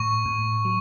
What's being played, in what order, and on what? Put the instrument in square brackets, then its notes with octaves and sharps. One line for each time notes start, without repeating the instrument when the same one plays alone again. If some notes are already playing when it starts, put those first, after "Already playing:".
Already playing: [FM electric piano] A2 [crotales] C#6
[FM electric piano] A2
F#3